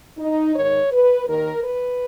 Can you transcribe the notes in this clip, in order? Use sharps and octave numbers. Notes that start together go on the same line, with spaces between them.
D#4
G#2 D#3 C#5
B4
D#2 D#3 A#4
B4